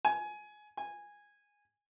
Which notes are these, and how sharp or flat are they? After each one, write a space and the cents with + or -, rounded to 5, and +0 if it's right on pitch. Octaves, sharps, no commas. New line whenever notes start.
G#5 +20
G#5 -10